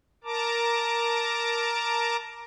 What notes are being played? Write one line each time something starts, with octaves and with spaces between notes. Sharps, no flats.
A#4 A5 A#5 D6